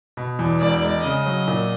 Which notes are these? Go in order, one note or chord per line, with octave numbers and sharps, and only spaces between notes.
B2
E2
E1 D5
G#3
C#3 D#5
F#3
A#2